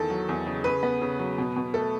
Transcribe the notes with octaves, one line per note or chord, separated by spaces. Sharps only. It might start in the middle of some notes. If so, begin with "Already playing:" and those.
Already playing: E2 D#3 A4
F#3
E2
C#3
C#3 B4
B3
C#3
F#3
B2
B2
A3 A4